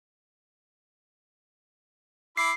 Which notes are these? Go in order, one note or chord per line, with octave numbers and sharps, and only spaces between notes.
E4 B5 D6 C7